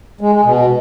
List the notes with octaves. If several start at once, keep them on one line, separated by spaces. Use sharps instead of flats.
G#3
G#3
B2